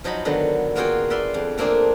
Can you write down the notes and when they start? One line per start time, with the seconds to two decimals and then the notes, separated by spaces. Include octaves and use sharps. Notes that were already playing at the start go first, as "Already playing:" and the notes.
0.04 F3 F#3 D#4 D#5 B5
0.25 D3 D#3 F#3 B3
0.76 A#3 B3 F4 F#4 G#4 G5
1.10 B4 D5 E5 F5 C6
1.34 F2
1.58 A3 A#3 C4 D4 G#4